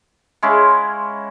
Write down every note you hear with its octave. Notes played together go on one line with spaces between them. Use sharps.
G#3 C#4 E4 F5